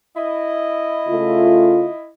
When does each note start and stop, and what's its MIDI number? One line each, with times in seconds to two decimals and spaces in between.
0.16 2.10 64
0.16 2.10 75
1.09 1.89 49
1.09 1.89 57
1.09 1.89 65